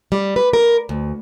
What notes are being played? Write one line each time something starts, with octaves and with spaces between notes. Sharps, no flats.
G3
B4
A#4
D2